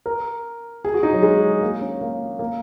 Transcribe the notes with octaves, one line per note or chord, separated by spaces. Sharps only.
A#4
G#4
F#4
D#4
F#3
G#3
A#3
C#4
A#3
A#3